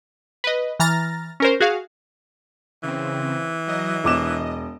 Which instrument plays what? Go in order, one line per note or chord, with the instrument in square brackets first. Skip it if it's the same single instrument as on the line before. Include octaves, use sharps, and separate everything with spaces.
[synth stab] B4 D#5
E3 A#5 F6 A6 A#6
C#4 A#4 C5
F#4 G#4 F5
[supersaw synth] C#3 C4 [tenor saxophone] E3
[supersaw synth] F#3 D#5
[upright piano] E1 D6 E7 [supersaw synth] D#5